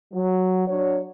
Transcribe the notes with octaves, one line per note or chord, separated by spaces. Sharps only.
F#3
F#3 D4 C#5